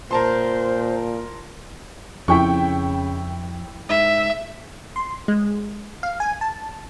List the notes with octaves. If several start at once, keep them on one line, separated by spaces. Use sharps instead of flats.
A#2 A#4 C5 A5 C6
F2 C#3 E4 G5 C#6
G#2 E5
C6
G#3
F5
G#5
A5